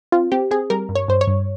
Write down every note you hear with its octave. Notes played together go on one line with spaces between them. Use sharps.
C4 F4
C4 G4
C4 G#4
G3 A#4
G2
C#5
G2 C5
C#5
G2